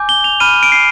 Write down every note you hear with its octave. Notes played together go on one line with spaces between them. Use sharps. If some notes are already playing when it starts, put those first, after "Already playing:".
Already playing: G#5 D6 G6
G7
F7
B5 F6 D#7
D7
C7